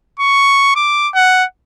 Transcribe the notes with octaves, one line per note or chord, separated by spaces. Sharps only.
C#6
D6
F#5